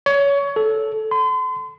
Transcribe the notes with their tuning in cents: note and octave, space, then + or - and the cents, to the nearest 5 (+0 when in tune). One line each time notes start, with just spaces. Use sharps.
C#5 +20
A4 -10
C6 -40